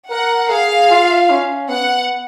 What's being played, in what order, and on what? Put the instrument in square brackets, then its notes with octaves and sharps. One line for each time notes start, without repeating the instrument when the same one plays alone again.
[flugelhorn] A#4 [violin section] F#5
[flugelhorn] G#4 [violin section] F5
[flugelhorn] F4
C#4
[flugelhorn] B3 [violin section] F#5